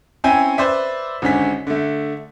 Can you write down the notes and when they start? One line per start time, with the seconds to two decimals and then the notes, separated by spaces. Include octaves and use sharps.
0.24 C4 C#4 E4 G5 G#5
0.58 B4 C5 D5 E5
1.22 G#1 D3 C#4 B6
1.67 D3 A3